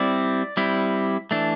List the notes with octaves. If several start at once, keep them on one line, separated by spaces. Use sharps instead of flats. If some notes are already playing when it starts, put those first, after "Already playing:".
Already playing: G3 C4 E4 D5
G3 C4 E4
E3 A3 D4